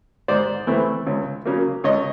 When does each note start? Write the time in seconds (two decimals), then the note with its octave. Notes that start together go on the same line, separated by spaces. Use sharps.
0.28 G#2 C5 D5
0.67 E3 A3 C4
1.07 C#2
1.45 C#3 F#3 A#3
1.84 C#2 C#5 D#5